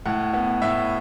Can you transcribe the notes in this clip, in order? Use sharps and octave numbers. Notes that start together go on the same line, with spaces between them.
A2 F#5
B3
A2 E5